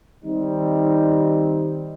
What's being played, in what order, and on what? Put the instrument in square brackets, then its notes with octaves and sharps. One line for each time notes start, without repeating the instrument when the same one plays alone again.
[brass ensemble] D#3 G3 C4 D#4